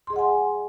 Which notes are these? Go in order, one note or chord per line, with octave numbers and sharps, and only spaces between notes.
G#4 D#5 F#5 G#5 C6